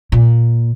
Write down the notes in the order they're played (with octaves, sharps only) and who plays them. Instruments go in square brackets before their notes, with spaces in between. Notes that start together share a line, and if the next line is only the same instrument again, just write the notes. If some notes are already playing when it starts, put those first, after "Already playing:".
[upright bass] A#2